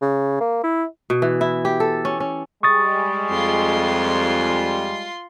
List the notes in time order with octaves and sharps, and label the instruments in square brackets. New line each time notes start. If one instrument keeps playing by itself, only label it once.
[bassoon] C#3
A#3
E4
[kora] B2
E3
E4
G4
A4
C#4
C#4
[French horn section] G3 G#3 [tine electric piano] C#6 D#6 A6
[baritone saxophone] F2 [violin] F4 C6